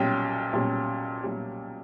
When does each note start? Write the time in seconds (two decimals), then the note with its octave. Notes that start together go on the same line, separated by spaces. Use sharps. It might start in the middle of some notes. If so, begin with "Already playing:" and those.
Already playing: B1 A#2 G3 C#4 G5
0.53 B1 A#2 G3 C#4
1.23 B1 A#2 G3 C#4